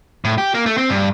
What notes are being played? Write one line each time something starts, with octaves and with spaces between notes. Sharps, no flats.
A2
G4
A#3
A3
C4
G2